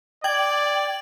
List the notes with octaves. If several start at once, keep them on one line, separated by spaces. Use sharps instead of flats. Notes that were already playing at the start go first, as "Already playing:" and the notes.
D5 G5 G#6 F#7